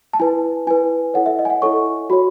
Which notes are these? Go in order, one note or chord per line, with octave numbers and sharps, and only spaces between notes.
A5
E4 B4 G#5
E4 B4 G#5
E4 A4 C#5 F#5
E5
D#5
G#5
F#5
E4 A4 C#5 C#6
F#4 C#5 B5